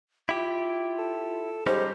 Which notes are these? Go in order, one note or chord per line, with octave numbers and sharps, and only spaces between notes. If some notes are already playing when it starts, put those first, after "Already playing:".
E4 F4 G4
A4
G#2 G3 C#4 D#4 G4 C5